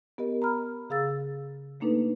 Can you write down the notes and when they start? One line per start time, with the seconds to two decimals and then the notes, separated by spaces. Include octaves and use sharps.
0.18 B3 G4 A#4 D#5
0.42 A#5 B5 F6
0.90 C#3 G#4 F5 E6 A6
1.80 A3 A#3 D4 D#4 A4 B4